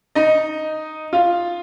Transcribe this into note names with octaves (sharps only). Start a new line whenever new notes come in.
D#4 D#5
F4 F5